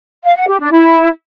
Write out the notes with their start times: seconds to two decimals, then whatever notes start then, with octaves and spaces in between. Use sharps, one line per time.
0.24 F5
0.36 F#5
0.48 G4
0.60 D4
0.71 E4